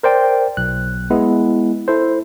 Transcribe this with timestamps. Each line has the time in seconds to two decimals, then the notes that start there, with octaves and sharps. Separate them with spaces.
0.03 A#4 C5 D5 G5
0.57 B1 F#6
1.10 G#3 B3 E4
1.88 E4 A4 C5